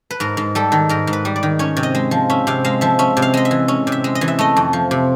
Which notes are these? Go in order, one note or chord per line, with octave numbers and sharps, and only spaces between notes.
B4
G#2 A#4
G#2
G3 A4
D#3
G#2 A#4
G#2
B4
G3
D5
D#3
C#4 C#5
C3
D#5
G#3
F3
C#4 E5
C3 F5
G#3 F5
F3 E5
C#4 E5
C3
F5
G#3 D#5
E5
E3
C#4
C3
E5
G#3
D#5
E3
E5
A3 D#5
F2
F3
C3